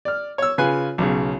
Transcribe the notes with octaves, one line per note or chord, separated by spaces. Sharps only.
D5 F6
C#5 E6
C#3 F4 B4 G#5 F#6
B1 C#3